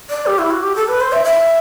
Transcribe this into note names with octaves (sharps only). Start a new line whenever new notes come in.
D5
G4
E4
F#4
G4
A4
B4
C5
E5
E5